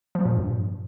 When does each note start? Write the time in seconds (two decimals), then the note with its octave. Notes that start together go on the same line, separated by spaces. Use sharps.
0.15 F3
0.25 A#2
0.36 G2